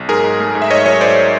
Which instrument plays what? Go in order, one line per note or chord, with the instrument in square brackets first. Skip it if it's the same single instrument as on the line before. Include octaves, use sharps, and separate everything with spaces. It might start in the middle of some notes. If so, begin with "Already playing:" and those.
Already playing: [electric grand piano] B1
G#2 G#4 A#4
G#2
A3
G#2
E5
G#2 C#5 D#5
F#3 C#5 D#5
G#2 C5 D5